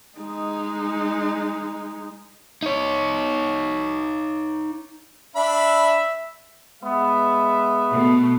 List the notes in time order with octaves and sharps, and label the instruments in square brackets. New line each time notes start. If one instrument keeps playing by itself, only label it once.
[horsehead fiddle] G#3 D#4
[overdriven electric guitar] D#4 C#5
[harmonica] D4 B5 [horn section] E5
[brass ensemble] G#3 E5 [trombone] B3
[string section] B2 A3